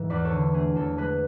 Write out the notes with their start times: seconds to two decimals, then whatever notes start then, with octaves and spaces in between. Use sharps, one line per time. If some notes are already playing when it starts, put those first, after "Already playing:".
Already playing: G#2 E3 E4
0.10 E2 B4 D5
0.25 A4 C#5
0.32 D3
0.54 A3 G#4
0.76 E2 A4
0.98 G#3 G#4 B4